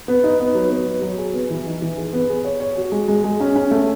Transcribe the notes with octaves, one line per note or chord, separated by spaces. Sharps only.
B3
D#4
B3
F#3
B3
F#3
F#3
G#4
B3
E3
D#4
E3
G#4
B3
G#4
C#5
C#5
F#4
G#3
G#3
G#3
C#4
C#4
A3